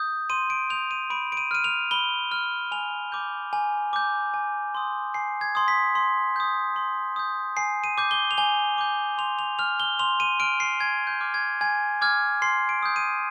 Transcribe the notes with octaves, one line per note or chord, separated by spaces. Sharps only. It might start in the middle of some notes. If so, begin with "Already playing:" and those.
Already playing: D#6 G6
C6 D#7
D7
D#6 G6 F7
D#7
B5 D7
D7
D#7
F6 D#7
F7
B5 G7
F6
G#5 F7
D6 G6
G#5
D6 G6
G#5
C6 D#6
G#5 C7
G#6
C6 D#6
B6
C6
D#6 G6
C6
D#6 G6
G#5 C7
D#7
D6 G6
G7
F7
G#5 G7
D6 G6
C6 F7
F7
F6 F7
G7
C6 F7
D#7
F6 D7
C7
G#5 G#6
G6
D6 F6
G#6
G#5 G#6
D6 F6 G#6
C6 C7
D7
D#6 G6
D#7